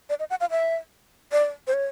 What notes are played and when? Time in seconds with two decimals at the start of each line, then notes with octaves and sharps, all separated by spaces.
0.09 D5
0.20 D#5
0.30 F#5
0.40 F5
0.51 E5
1.32 D5
1.67 C5
1.73 C#5